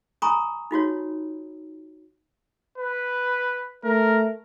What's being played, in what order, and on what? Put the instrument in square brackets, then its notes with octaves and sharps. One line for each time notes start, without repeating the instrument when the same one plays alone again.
[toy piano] G#5 A#5 B5 C#6 D#6
D#4 F4 F#4 C#5
[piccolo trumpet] B4
[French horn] A3 [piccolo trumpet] A#4